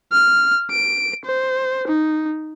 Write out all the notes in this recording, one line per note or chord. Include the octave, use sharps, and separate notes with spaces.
F6
D7
C5
D#4